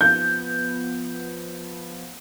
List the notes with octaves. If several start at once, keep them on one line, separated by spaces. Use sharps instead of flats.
F3 B3 G6